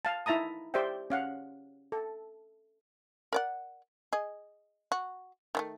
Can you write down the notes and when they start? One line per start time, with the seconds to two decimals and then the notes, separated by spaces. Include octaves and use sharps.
0.05 F5 A5
0.26 D#4 E4 E5 A5 A#5 D#6
0.74 G4 C5 D5 E5 G5
1.10 C#4 F5 F#5
1.92 A4
3.33 A#4 D5 F#5
4.13 G#4 D#5
4.92 F#4
5.55 D#3 F#3 A3